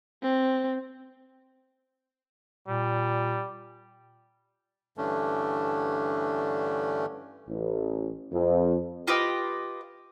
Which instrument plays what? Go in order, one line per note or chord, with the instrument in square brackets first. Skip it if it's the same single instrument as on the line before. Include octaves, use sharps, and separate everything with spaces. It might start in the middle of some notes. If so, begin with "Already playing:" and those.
[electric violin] C4
[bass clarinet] A#2 [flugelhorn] G3
[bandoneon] G2 D3 E3 A3 C#4 D4
[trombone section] A1
F2
[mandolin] F4 G4 B4 D#5